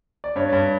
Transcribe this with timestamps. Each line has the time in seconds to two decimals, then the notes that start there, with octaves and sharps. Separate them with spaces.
0.24 D5
0.36 G2 C#5
0.53 G2